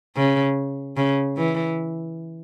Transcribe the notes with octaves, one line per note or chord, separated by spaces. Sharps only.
C#3
C#3
E3